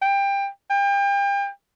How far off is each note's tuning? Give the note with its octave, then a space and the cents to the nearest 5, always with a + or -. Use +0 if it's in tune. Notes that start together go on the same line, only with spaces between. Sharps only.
G5 +20
G5 +35